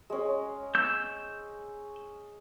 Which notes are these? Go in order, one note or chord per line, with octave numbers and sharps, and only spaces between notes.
G#3 C#4
E6 G6